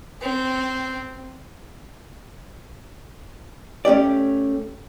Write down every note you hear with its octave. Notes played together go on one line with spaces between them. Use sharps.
C4
A3 C#4 G4 D5